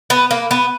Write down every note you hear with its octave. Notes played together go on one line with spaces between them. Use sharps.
B3
A#3
B3